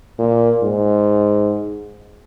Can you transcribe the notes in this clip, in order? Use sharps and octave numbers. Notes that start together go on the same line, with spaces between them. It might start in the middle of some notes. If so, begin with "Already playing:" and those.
A#2
G#2